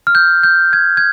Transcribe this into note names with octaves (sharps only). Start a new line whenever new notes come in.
F6
G6
G6
G#6
G#6